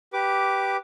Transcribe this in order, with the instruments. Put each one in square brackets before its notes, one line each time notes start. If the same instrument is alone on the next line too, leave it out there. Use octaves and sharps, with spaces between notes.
[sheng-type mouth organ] G4 B4 D6